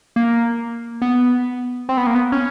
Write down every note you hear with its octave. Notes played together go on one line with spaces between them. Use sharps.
A#3
B3
C4
B3
A#3
B3
C#4